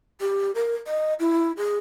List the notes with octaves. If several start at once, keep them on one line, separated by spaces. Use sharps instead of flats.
G4
A#4
D#5
E4
G#4